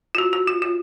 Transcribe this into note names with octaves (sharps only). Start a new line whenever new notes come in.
F4
F#4
F#4
F4
F4